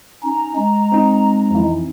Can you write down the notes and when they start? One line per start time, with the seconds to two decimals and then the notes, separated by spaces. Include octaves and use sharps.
0.23 C#4 D#4 A#5
0.56 G#3
0.92 C4 D#4
1.50 F2 E3